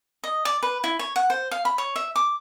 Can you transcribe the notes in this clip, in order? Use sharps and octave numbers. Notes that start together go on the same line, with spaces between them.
D#5
D5
B4
E4
C#5
F#5
C5
F5
B5
C#5
E5
D6